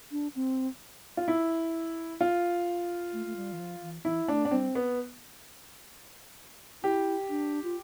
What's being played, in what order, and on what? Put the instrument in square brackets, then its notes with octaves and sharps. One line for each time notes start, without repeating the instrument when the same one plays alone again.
[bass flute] D4
C4
[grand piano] F4
E4
F4
[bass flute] A3
A3
G3
E3
F3
E3
[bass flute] E3 [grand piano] E4
[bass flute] A3 [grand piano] D4
[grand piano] D4
[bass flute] G3 [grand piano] C4
[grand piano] B3
[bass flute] E4 [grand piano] G4
[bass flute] D4
F4